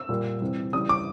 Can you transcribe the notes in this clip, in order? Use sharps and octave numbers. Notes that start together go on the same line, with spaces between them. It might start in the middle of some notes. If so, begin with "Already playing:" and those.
Already playing: E6
A#2 G3
C3 E3 G3
C#3 E3 G3 D#6
D6